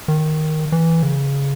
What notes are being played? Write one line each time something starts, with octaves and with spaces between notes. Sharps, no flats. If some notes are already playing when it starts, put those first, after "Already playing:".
D#3
E3
C#3